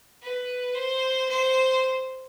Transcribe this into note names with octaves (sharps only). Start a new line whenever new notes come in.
B4
C5
C5